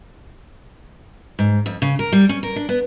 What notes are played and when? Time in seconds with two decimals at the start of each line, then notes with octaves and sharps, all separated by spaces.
1.39 G#2
1.66 F2
1.82 C#3
1.99 A#4
2.13 G3
2.29 C#4
2.43 A#4
2.56 D4
2.69 B3